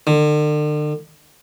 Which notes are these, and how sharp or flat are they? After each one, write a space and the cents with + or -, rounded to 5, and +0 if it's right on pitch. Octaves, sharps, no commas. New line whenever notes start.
D3 +40